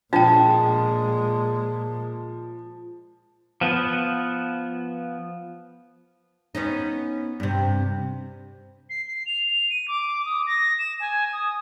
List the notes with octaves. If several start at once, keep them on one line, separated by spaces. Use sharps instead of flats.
A#2 F3 G#3 D4 G5 A5
F3 B3
B3 C#4 D#4
G2 C3
C7
C7
F7
D#7
D6
D#6
A#6
E7
G#5
D#6